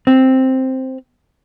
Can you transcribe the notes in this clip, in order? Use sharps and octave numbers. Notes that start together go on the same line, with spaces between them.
C4